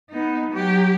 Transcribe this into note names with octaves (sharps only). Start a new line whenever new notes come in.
B3 D#4
F#3 G4